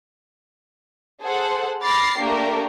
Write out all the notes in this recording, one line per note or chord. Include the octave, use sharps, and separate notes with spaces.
G#4 A4 C5 F#5
B5 D6 F6 A6 A#6 C7
A3 A#3 D4 G4 A#4